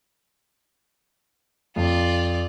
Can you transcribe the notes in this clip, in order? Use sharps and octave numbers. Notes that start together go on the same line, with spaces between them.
F2 F4 D5